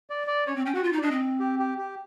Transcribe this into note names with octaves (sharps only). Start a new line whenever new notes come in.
D5
D5
C#4 C#5
C4
C#4 G5
F#4 F#5
F4
D#4
D5
D4 D#5
C4
G4
G4
G4